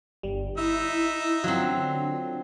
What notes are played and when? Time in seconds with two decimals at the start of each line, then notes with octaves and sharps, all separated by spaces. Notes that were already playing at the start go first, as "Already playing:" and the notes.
0.23 G1 G3
0.57 D#4 E4 E5 E6
1.44 D3 F#3 C4 F4